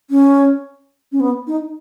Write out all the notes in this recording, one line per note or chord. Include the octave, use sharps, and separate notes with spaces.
C#4
C#4
B3
D#4